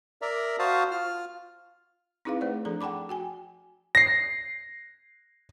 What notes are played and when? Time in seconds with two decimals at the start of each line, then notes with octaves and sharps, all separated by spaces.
0.22 A#4 D5 E5 A#5
0.59 F#4 C5 F5 A5 D#6
0.91 F4 F6
2.25 C4 D#4 E4 G#4 B4 F5
2.41 A3 B4 C5 D5
2.65 F3 D4 G#4 A4 A#5
2.81 F#5 G5 A5 B5 D6
3.09 F#4 G5 G#5
3.95 A#6 C7